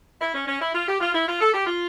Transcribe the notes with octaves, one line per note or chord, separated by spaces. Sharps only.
E4
C#4
C#4
E4
F4
G4
F4
E4
F4
A4
G4
F4